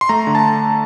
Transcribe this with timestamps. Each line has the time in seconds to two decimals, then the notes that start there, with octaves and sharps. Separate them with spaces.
0.01 C6
0.09 A3 A#5
0.27 D3
0.35 A5